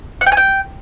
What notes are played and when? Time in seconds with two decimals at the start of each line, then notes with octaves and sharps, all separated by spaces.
0.21 F#5
0.26 G5
0.32 G#5
0.37 G5